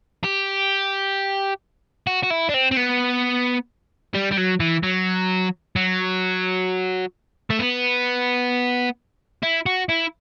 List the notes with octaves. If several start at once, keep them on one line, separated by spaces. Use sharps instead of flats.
G4
F#4
F#4
E4
D4
C4
C4
B3
G3
G3
F#3
E3
F#3
F#3
A3
B3
E4
F#4
E4